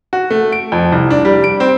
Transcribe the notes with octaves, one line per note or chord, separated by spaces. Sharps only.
F#4
A3
D7
F2
C2
D4
G3
D7
C4